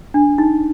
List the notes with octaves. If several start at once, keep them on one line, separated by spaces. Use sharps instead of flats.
D4
D#4